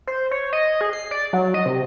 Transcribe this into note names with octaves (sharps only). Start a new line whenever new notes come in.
C5
C#5
D#5
G#4
C7
D5
F#3
D#5
C3